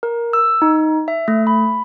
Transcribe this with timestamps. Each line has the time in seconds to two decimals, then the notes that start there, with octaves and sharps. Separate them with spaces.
0.03 A#4
0.33 E6
0.62 D#4
1.08 E5
1.28 A3
1.47 B5